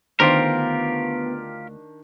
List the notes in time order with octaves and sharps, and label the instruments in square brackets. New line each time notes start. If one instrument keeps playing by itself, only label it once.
[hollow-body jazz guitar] D2 C5 [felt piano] D#3 D4 [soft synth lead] B3 [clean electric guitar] F4 G4 A#4